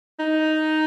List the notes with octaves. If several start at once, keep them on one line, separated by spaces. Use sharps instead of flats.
D#4